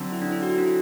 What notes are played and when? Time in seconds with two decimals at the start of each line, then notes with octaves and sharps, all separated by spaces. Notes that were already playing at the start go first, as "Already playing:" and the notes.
Already playing: D3 F#3 C4
0.12 E4
0.22 D4
0.32 E4
0.43 F#4
0.50 E4
0.58 D4
0.66 E4